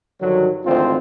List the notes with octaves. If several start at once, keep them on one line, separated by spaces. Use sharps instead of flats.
G2 D3 D#3 F#3
G#1 D2 E3 C4 F4 C5